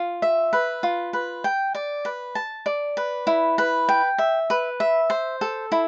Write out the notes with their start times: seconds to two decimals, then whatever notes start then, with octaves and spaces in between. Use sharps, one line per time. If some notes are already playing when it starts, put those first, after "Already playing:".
Already playing: F4
0.22 E5
0.53 B4
0.83 F4
1.13 B4
1.44 G5
1.75 D5
2.05 B4
2.35 A5
2.66 D5
2.97 B4
3.27 E4
3.58 B4
3.89 G5
4.18 E5
4.50 B4
4.80 E5
5.10 C5
5.41 A4
5.72 E4